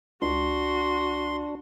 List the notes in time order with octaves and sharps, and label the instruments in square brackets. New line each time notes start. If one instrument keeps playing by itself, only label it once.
[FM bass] C#2 [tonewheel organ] D4 [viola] F#4 [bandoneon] C6